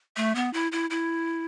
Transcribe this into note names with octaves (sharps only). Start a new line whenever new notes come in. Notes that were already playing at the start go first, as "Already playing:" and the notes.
A3
B3
E4
E4
E4